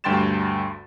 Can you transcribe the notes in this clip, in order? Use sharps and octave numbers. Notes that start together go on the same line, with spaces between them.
D2 G2 G5 C6 A6 E7